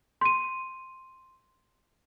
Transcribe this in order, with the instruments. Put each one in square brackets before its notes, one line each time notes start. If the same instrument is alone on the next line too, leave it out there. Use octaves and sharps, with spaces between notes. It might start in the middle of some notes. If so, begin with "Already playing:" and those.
[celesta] C6 D#7